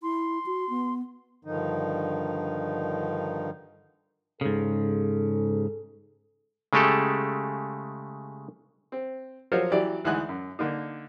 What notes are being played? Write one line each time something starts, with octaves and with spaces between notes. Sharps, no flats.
E4 C6
F#4
B3
G2 D3 D#3 F3 D#4
G#2 C#3 A4
C#3 G#3 A3 G4 A4
C4
F3 F#3 F4 A#4 C5 C#5
E3 F#3 G4 D5
D2 E3 G#3 D#4 G#5 F#6
F#2
D3 A#3 D#4